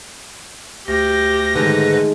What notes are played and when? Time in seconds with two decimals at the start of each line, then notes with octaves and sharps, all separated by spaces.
0.88 D2 G4 A#6
1.55 G#2 D3 D#3 G#3 A3 B4